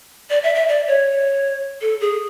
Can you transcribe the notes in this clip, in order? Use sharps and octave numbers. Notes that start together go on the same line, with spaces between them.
D5
E5
E5
D5
C#5
A4
G#4